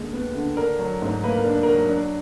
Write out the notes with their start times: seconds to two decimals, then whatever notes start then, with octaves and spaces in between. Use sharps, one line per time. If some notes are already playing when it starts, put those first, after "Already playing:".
Already playing: D#2 D3 G#3
0.13 B3
0.35 D3
0.57 D4 A#4
0.79 F#3
1.02 G#2
1.24 A#3 B4
1.37 A#4
1.45 D4
1.63 F#3 A#4
1.89 D4